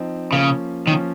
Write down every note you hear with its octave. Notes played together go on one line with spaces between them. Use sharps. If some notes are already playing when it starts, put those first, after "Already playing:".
Already playing: F3 C4 D#4
C#3 F3 A#3 C#4
D#3 F3 A#3 C#4